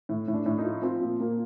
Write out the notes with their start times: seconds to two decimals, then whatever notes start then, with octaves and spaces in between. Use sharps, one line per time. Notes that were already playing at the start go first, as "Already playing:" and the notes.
0.09 A2
0.28 A2
0.34 D4
0.46 A2
0.58 D#4
0.64 F3
0.82 F3 C4
1.01 A#2
1.20 A#2 A#3